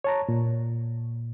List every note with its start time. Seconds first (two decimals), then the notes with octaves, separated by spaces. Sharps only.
0.04 C#5 A5 A#5
0.29 A#2